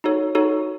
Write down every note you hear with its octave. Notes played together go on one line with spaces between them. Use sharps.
D#4 F#4 A4 C#5
D#4 F#4 A4 C#5